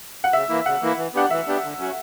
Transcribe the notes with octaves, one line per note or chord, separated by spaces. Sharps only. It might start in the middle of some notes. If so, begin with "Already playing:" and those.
F#5
C#3 E5
E3 A#3 E4
C#3 F#5
E3 A#3 E4
E3
B3 D4 G4 F#5
E3 E5
B3 D4 G4
D3
F#3 C#4 F#4